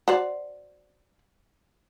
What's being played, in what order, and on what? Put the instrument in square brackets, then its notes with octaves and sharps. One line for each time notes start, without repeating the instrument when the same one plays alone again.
[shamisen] F#4 C5 D5